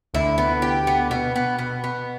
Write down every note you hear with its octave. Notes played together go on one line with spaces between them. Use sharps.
D2 D3 E4
B3
G4
B3
B2 B3
B3
B2 B3
B3